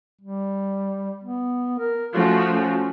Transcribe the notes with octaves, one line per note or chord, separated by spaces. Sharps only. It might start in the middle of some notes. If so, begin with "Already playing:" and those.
G3
B3
A#4
F3 A3 C#4 F#4
C#4